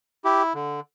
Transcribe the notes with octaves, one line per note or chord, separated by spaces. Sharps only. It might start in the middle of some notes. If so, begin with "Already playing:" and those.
E4 G4
D3